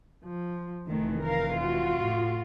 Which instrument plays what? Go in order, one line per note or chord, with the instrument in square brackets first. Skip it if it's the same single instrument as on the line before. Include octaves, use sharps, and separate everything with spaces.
[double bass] F3
[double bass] F1 E3 [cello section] D#3 A3
[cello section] A#4 F5
F4 F#4
[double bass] A2